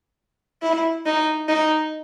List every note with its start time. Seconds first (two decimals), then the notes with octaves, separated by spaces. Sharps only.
0.62 E4
1.06 D#4
1.48 D#4